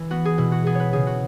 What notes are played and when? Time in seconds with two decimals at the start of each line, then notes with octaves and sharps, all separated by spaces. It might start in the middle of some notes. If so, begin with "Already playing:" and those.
Already playing: E3
0.11 B3 F#4
0.25 G#4
0.38 B2 E4
0.52 F#4
0.66 B3 G#4
0.75 B4 C#5
0.93 C#3 G#4
1.07 F#4